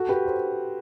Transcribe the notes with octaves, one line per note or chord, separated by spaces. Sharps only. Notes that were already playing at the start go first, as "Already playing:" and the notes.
Already playing: F#4 A4
G4 B4
A4 C5